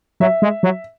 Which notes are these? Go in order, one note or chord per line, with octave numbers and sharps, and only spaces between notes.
F#3 E5
G#3
F#3